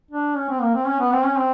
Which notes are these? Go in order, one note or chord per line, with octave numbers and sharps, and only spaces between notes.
D4
C#4
C4
A#3
C4
C#4
B3
C4
C#4
C4